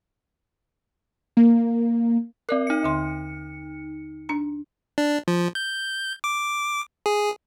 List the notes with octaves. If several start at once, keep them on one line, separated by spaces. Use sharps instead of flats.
A#3
C4 A#4 D5 F#6
D#4 C#7
D#2 D3 C6
D4 A#5
D4
F3
G6
D6
G#4